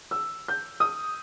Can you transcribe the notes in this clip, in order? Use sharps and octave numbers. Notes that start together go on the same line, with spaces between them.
E6
G6
D#6